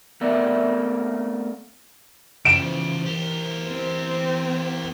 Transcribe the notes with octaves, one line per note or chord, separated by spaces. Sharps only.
A3 B3 C4 A#4 D5 E5
C#3 E3 F3 C5 A6 D7 E7
G4 A#4
C4